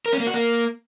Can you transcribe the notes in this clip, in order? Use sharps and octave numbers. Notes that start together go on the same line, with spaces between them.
A#4
C#4
A#3
F#4
A#3